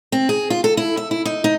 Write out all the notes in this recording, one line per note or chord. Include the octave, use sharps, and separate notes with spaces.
C4
G#4
F4
A4
E4
E5
E4
D#4
D#4